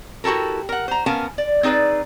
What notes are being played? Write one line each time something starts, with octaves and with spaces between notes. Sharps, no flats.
E4 F#4 G4 A4 A#4
A#4 F#5
C5 A#5
B3 C#4 A#4 F5 G#5 A5
D5
C4 D#4 G#4 B4 D5